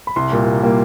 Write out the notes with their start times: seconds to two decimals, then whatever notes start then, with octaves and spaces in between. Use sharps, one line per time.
0.07 B5
0.16 C2 C6
0.32 A#2 G3 A#3
0.46 C2
0.62 A#2 G3 A#3